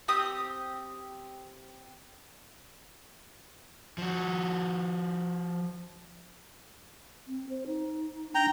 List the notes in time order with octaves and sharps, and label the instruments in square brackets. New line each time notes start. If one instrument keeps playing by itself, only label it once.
[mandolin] C4 G4 D#6
[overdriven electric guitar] F3 F#4
[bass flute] C4
C5
D#4
[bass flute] D4 [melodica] G5 A#5